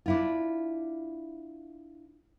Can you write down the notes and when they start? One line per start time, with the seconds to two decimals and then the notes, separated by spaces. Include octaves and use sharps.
0.06 D4 E4 F4